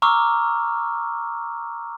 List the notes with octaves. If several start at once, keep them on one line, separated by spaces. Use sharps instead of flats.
A#5 C#6 D6 E6 F6